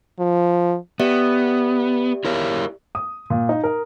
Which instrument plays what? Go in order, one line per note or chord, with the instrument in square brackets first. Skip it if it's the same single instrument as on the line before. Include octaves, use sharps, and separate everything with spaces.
[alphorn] F3
[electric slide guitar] B3 [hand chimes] G4 D5 E5
[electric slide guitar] E4 A#4 C#5
[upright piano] D#6
A#2
D#4
A#4